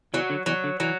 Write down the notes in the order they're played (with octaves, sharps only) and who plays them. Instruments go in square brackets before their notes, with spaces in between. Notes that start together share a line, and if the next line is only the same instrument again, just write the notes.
[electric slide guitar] E2 E3 [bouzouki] F#3
[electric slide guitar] D3
[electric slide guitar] E2 E3 [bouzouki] F#3
[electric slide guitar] D3
[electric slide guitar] E3 [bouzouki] F#3